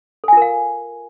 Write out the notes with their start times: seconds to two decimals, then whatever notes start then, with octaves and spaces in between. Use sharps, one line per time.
0.24 A4
0.28 G#5
0.33 F4
0.37 A#4
0.42 F5